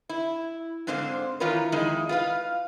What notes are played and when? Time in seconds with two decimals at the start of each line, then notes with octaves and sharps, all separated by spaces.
0.09 E4
0.87 G#2 D3 C4 C5 F5
1.40 D#3 E3 F4 A#4 B4 C#5
1.72 F2 D#3 G#3 D#4 E4
2.09 F4 B4 F5